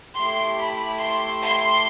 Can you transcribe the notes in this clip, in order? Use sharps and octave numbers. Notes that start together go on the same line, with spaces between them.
A3 E4 G4 C6
B5
C6
C6